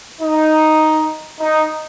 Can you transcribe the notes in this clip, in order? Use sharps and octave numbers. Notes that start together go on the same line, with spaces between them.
D#4
D#4